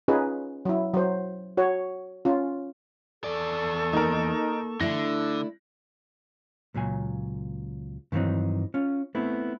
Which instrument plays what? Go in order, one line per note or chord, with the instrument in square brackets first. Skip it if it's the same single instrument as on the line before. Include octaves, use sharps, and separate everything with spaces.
[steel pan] C#4 D#4 F4 G#4 B4
F#3 E4
F#3 C5
F#4 C#5
C#4 F4
[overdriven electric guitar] E2 D5 [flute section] A4 A5 C#6
[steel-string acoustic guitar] A#3 [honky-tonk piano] D#4 A#4
[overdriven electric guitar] D3 [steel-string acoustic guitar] A3 D4 E4 [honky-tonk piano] A#6
[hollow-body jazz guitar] C#2 A#2 F#3 G#5
G2 D#3 E3 F#3 C4 D#4
C#4 F4
A3 B3 C4 E4